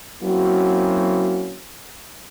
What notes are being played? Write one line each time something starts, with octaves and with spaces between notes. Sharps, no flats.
F#3 A#3 C4 C#4 E4 F#4